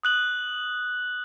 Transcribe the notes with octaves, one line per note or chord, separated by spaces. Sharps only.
D#6 F#6 F#7